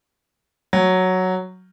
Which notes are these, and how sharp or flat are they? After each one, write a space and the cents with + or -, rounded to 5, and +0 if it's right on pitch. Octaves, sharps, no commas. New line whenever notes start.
F#3 +0